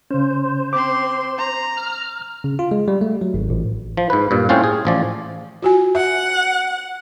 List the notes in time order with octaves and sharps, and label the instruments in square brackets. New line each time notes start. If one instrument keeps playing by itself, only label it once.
[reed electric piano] C#3 C#4 [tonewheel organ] C5
[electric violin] C4 C6 [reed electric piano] D6
[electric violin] A#5
[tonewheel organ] F6
[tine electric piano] C#3
F4
G#3
G3
A3
F#3
G#1
A1
[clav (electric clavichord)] F3
G#2 B4
G2 A#2
A2 C4 C#4 F4 C5 F5
G#4
A1 F3 D5
[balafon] F4 F#4 G#5
[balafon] E5 [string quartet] F#5